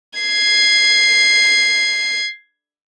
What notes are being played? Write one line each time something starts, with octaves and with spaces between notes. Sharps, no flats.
G#6 C7